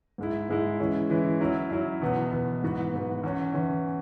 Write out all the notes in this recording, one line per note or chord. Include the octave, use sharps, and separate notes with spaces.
G#2 G#3 E4
G#2 G#3 E4
E3 G#3 C#4 E4
E3 G#3 C#4 E4
F#2 F#3 E4
F#2 F#3 E4
E2 B2 B3
E2 B2 B3
G#2 E3 B3 F#4
G#2 E3 B3 F#4
E2 E3 C#4
E2 E3 C#4